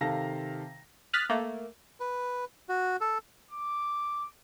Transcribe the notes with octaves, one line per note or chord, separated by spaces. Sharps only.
C3 D#3 A4 F5 A5 A#6
D#6 F6 F#6 A6 B6
A3 A#3
B4
F#4
A4
D6